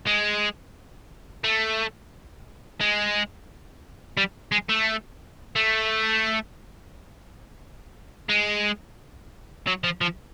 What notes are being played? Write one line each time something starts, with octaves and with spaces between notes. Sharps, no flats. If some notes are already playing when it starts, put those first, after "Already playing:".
G#3
A3
G#3
G3
G#3
A3
A3
G#3
F#3
F3
F3